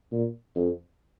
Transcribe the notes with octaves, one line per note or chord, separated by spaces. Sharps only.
A#2
F2